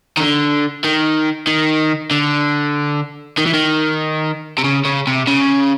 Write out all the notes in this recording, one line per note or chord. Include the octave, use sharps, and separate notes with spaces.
D#3
D3
D#3
D#3
D3
D#3
E3
D#3
C3
C#3
C#3
C3
C#3